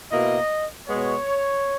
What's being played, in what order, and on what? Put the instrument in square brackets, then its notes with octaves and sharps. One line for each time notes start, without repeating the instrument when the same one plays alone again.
[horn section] B2 A#3 E4 D#5
B2 G#3 B3 C#5